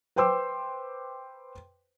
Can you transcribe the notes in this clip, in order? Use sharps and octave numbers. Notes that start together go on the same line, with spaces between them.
B4 C5 G5 C6 D6 E6